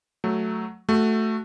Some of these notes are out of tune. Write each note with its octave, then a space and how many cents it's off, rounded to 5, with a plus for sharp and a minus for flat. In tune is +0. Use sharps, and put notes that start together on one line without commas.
F#3 +0 A3 +0
A3 +0 F#4 +0